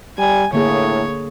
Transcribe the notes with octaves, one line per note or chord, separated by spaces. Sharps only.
G3 G#5
A2 D3 A#3 G#4 C#5